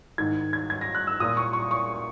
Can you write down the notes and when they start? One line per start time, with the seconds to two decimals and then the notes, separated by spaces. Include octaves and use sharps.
0.18 G#2 D#3 G#6
0.53 G#6
0.70 G#6
0.81 A#6
0.95 F#6
1.07 E6
1.20 A#2 D#6
1.37 C#6
1.53 C#6
1.71 C#6